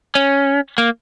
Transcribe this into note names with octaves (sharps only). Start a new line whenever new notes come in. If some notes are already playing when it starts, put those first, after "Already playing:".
C#4
A#3